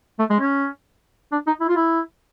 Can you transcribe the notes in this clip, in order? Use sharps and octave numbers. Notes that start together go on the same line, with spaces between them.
A3
G#3
C#4
D4
D#4
E4
F4
E4